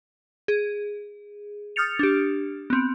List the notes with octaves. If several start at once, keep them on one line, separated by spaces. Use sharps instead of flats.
G#4
D#6 F6 G6 A6 C#7 F7
D4 G4
B3 C4